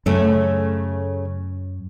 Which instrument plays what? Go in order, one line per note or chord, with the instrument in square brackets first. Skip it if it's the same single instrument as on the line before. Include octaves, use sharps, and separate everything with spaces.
[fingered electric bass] F#2 [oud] C#3 A3 C#4